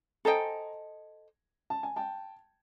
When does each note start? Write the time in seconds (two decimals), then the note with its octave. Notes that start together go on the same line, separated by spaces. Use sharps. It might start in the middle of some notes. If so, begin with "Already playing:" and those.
0.25 A4 C5 D#5 G5 G#5 A#5
1.70 A5
1.83 G#5
1.96 G5 A5